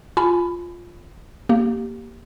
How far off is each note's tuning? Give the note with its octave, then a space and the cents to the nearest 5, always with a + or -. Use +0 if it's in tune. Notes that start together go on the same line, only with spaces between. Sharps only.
F4 +0 G#5 +20 B5 +15
A#3 +0 G4 -10